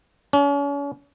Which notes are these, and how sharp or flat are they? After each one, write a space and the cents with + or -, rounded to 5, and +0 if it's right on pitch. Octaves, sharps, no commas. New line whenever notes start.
C#4 +40